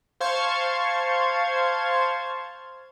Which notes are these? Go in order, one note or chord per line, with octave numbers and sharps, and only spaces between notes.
C5 F5 A5 C6 C#6 G#6